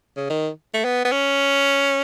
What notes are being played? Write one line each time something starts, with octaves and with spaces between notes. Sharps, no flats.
C#3
D#3
A3
B3
B3
C#4